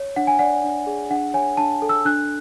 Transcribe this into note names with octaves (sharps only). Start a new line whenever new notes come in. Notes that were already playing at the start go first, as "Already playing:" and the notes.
Already playing: C#5
D4 F#5
G#5
D5 F#5
D4
G#4
D4 F#5
C#5 G#5
D4 A5
A4
E6
D4 F#6